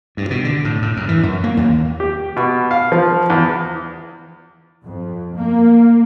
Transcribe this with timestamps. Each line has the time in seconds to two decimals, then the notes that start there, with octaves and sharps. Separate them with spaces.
0.17 G2
0.30 B2
0.45 D3
0.65 A2
0.82 A2
0.97 F#2
1.09 E3
1.23 F#2
1.44 A#3
1.57 D#2
2.00 G4
2.36 B2
2.71 F5
2.92 F3
3.30 E2
4.84 F2
5.37 A#3